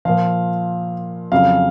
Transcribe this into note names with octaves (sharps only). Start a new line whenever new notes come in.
A#2 F3 F5
F2 C#3 F#3 F5